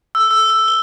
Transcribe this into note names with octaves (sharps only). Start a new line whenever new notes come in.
E6
E6
E6
G7